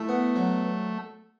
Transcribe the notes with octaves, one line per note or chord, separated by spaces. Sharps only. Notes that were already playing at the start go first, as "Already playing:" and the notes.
Already playing: A3 E4
B3
F#3